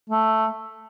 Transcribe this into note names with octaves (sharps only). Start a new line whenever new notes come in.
A3